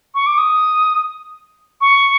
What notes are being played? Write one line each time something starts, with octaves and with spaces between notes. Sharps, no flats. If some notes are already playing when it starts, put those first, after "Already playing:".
C#6
D6
D#6
C#6